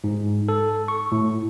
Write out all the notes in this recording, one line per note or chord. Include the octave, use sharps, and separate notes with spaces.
G#2
A4
C#6
A2